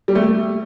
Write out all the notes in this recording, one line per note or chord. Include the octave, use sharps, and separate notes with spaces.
G3
A3